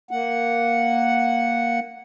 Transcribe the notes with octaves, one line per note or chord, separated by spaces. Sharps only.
A#3 F#5